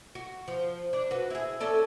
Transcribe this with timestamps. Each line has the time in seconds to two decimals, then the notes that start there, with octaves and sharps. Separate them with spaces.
0.15 F#4
0.48 F3
0.93 D4
1.11 F#4 B4
1.30 E4 G#4
1.60 C#4 A4 D5